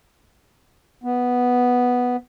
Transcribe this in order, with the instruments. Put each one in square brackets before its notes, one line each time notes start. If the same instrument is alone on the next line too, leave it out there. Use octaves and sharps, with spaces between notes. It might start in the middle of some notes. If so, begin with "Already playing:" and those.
[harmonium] B3